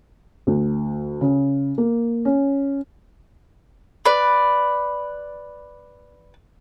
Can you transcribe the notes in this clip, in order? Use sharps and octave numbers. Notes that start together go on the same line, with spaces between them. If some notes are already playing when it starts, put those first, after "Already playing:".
D2
C#3
A#3
C#4
B4 D5